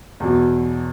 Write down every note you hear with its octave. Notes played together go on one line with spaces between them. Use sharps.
E2 B2 F#3